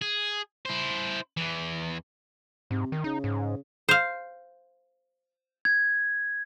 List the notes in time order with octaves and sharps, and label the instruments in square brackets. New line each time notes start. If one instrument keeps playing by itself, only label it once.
[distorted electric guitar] G#4
E4 C5
E2 E3
[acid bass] G#2 [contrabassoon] C3
[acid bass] D#3
[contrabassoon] C#3 [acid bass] D#4
[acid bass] G#2
[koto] C5 F5
[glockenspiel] G#6